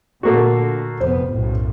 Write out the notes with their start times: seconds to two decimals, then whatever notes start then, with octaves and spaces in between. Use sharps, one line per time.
0.23 A#2 D3 A3 A#3 F#4
1.00 F1 F2 B3 C5
1.30 B1 F#2 A2